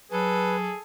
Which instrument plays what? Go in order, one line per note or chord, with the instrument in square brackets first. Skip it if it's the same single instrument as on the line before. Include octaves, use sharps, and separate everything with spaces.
[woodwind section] F#3 [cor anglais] G#4 [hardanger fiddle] A4 [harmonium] B4